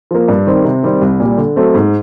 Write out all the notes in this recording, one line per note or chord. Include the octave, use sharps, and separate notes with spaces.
F3 A#3
G2
D#3 G3 C4
C3
D#3 G3 C4
C2
A#2 G3
D3
F#3 A3 C4
G#2